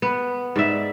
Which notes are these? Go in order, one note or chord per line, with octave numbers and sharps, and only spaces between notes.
B3
G#2 D5 E5